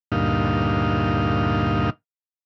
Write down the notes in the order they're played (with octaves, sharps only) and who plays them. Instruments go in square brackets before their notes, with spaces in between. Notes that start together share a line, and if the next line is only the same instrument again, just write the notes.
[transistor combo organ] D2 G2 A#2 D#4 F5